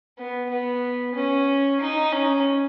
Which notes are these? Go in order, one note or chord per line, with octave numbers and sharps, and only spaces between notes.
B3
B3
C#4
D#4
C#4